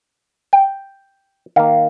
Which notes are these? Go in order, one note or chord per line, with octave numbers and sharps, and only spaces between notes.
G5
D#3 A#3 F5